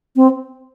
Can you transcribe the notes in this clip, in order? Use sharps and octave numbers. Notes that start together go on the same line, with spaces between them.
C4